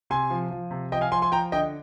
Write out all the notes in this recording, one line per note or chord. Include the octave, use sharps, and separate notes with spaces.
C3 G#5 C6
F3
F3
C3
F3 D#5 G5
F5 G#5
F3 G#5 C6
G#5 C6
F3 G5 A#5
D3 D#5 G5